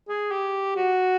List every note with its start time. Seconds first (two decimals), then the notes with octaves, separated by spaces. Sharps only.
0.09 G#4
0.31 G4
0.76 F#4